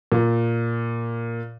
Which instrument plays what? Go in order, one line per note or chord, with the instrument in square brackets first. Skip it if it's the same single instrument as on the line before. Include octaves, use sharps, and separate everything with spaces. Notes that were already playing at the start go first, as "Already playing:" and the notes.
[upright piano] A#2